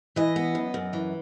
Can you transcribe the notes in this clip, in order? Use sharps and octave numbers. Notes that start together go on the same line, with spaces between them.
E3 D#5
B3
F#2
F#2
E3